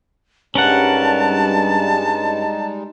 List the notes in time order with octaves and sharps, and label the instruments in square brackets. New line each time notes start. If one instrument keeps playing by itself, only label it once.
[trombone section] G2 [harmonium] G3 G#3 D#4 [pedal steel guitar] C#4 A#4 F#5 [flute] A5